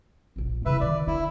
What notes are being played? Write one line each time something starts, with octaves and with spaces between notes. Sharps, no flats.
D#1 A#1
C#3 E4 B4 E5
D3 D#3 D5
D4 E4